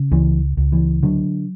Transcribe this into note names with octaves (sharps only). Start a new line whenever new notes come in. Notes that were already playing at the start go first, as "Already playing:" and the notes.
Already playing: C#3
C#2 E3
C#2
E3
D3 F#3